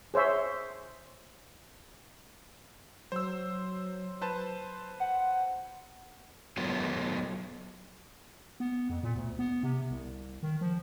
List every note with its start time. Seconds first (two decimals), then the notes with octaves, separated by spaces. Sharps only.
0.14 G#4 C5 C#5 E5
3.12 F#3 C5 E6
4.21 B4 C5 A5
5.00 F#5
6.57 F#3 B3 F4 A4 A#4
8.60 B3
8.90 F2
9.03 A#2
9.16 D2
9.39 B3
9.63 C3
9.91 C2
10.43 D#3
10.61 F3